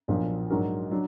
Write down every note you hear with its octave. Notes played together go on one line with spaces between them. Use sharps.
B1 A#2 F3 A#3 D4
G#2 F#3 D4 F#4 A#4
F#3 D4